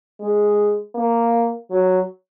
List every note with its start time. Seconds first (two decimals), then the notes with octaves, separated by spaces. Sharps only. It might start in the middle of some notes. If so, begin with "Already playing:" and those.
0.21 G#3
0.95 A#3
1.71 F#3